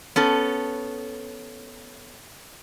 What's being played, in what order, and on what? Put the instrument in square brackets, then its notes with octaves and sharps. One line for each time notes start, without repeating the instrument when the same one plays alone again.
[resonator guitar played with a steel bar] B3 C#4 A4